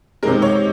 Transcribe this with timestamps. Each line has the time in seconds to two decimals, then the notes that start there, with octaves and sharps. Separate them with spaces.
0.23 C3 D#3 G#3 A#4
0.42 C#5